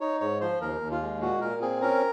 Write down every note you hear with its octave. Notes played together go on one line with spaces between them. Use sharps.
D#4 C#5
G#2 C#5
F3 C5
D#2 A#4
D#2
F4
G#3
A#2 F#4
A#2 A#4
C4 G#4
C#4 A#4